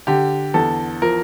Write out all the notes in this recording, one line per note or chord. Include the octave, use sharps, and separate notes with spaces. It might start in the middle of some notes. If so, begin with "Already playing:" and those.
D3 G4
E2 A4
F3 A#4